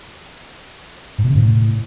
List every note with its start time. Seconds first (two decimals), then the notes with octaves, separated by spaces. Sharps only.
1.18 G#2
1.24 B2
1.30 C#3
1.35 G#2
1.41 A2